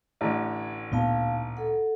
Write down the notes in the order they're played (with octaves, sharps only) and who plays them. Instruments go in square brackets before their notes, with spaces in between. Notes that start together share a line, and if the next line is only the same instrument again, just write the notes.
[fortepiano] A1 A2 D3
[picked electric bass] D2 A#2 B3 [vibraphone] D#4 F5 A5
[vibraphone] A4 F#5